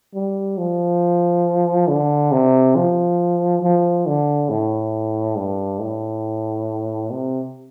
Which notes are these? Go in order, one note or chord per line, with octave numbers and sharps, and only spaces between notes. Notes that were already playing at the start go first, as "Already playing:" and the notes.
G3
F3
D3
C3
F3
F3
D3
A2
G2
A2
C3